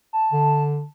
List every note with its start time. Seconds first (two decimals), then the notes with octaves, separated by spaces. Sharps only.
0.13 A5
0.32 D3